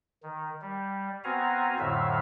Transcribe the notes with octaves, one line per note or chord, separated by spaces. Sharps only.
D#3
G3
B3 C4 F#4 F5 G#5 A#5
F2 A2 D3 F#3 E5 F5